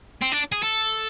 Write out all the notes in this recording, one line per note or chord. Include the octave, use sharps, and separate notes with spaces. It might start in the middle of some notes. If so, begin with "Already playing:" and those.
C4
D4
G#4
A4